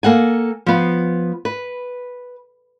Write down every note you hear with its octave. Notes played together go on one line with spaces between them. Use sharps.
A#3 A4 F#5 G#5
F3 B3
B4